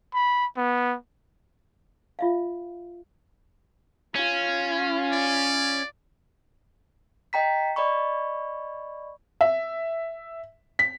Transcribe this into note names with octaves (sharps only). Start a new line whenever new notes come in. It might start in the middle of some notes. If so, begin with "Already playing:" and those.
B5
B3
F4 E5 F5
C#4 F4
D5
D#5 G5 A#5 B6
D5 D#5 B5 C#6
E5
B6